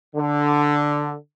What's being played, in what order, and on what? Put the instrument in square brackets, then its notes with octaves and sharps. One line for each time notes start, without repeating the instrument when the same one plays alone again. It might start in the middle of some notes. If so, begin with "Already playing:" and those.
[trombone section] D3